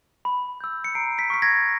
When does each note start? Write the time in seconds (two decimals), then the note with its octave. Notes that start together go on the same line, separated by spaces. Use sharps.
0.25 B5
0.60 E6 G6
0.84 C#7
0.95 A#5 C7 D7
1.18 B6 C#7
1.30 C#6 F6 B6
1.42 G#6 A#6